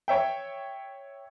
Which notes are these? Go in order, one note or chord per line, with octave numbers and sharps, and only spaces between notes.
C#5 E5 G5